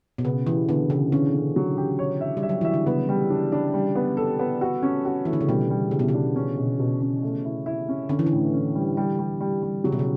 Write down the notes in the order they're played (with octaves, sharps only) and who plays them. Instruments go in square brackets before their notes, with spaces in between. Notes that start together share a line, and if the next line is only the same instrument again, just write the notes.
[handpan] B2
[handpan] C#3 [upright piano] B3
[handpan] E3 [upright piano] G4
[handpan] D3 [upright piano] B3
[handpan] C#3 [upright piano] G4
[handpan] D3 [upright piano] C#4
[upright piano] C#4
F#3
G4
C#5
E5
[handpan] G3
[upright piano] E5
[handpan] F#3
[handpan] E3 [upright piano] E5
[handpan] D3
[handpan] C#3 [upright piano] B3
[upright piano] G3
D4
D4
G3
B3
A4
B3
F#4
C#4
F#4
[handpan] E3 [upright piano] A3
[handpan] D3
C#3
[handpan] B2 [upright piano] G3
[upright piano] G3
[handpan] C#3 [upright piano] G3
[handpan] B2
C#3
[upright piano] D4
C#4
B2
B2
C#4
A3
E4
E4
C#4
[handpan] D3 [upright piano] C#4
[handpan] E3
D3
[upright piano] A2
C#4
G3
G3
G3
G3
G3
[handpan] C#3 [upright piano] F#3
[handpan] B2
C#3